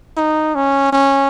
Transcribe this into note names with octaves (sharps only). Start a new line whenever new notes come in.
D#4
C#4
C#4